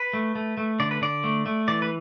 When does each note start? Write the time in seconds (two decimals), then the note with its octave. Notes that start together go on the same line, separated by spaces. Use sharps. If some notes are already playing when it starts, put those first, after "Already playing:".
Already playing: B4
0.13 A3
0.35 A3
0.57 A3
0.80 D3 D5
0.91 B4
1.02 D3 D5
1.24 A3
1.46 A3
1.68 E3 D5
1.82 B4